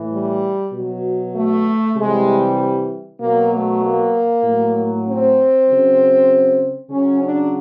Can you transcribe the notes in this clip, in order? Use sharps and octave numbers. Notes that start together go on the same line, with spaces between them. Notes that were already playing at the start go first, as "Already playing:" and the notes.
Already playing: A2 E3
G3
B2 F#3
A3
C3 E3 G3 G#3
B2 F#3 A#3
A3
A#3
A2 F#3
C4
C#3 F#3
C#3 F#3 C#4
D4